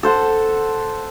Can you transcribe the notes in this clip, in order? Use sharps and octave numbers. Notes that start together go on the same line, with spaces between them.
A4 C5 F#5